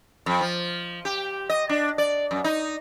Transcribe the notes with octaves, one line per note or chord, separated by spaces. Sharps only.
F2
F3
G4
D#5
D4
D5
F#2
D#4